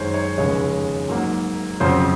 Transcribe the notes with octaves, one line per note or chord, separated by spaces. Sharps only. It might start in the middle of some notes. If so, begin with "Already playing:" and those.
Already playing: F#2 D#3 G#3 D#4 C5 C#5
C#5
F1 D#2 C#3 G#3 C#5
G#2 F#3 A#3
F2 C#3 F#3 C#4 C5